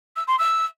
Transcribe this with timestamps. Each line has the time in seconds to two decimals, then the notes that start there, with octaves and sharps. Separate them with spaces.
0.16 E6
0.27 C6
0.39 E6